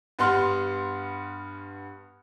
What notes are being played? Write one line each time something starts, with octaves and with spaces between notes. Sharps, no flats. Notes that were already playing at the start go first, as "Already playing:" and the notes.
G2 B3 F#5 C6 F6